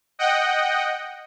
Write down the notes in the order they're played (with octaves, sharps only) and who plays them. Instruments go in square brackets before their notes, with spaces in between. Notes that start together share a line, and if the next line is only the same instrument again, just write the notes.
[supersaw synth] D#5 F#5 G5